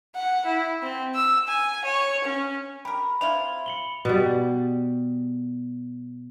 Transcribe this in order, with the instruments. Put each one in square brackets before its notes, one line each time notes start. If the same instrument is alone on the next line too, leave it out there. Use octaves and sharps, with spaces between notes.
[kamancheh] F#5
E4
C4
E6
G#5
C#5
C#4
[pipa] G4 A#4 [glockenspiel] B5
[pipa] C3 E4 F4 [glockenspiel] F7
[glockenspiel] C#7 F#7 G7
[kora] B2 G3